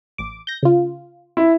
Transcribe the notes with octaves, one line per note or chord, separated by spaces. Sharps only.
A1 D6
G6 A#6
C#3 F4
E4